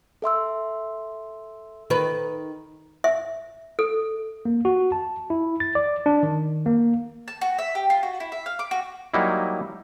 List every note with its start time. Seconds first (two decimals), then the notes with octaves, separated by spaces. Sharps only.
0.22 A4 E5 C6 E6
1.90 D#3 B4
3.04 E5
3.79 A4
4.45 A#3
4.65 F#4
4.92 A5
5.30 E4
5.60 A6
5.75 D5
6.06 D4
6.23 D#3
6.66 A#3
7.28 A5
7.41 F#4
7.59 E5
7.75 G4
7.90 F4
8.03 F#4
8.20 E4
8.32 E5
8.46 F5
8.59 D6
8.71 F#4
9.14 F#3 G3 A#3 D#4 E4